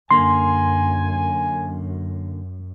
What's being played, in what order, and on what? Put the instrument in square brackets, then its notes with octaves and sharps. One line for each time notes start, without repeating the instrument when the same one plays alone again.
[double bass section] F#2 [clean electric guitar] D3 A#3 [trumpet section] G#5 [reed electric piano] C6